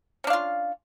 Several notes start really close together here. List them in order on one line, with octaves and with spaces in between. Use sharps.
C#4 D4 F5 F4